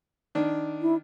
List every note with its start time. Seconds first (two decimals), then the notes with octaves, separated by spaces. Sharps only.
0.35 D#3 D4
0.81 E4